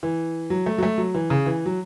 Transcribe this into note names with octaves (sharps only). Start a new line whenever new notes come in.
E3
F#3
A3
F#3
A3
F#3
E3
C#3
E3
F#3